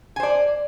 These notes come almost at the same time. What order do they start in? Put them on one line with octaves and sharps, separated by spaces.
G#5 C5 D5